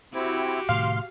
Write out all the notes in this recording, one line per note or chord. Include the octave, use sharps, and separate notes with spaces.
C4 E4 F#4 G4
A2 C3 D#3 F5 C6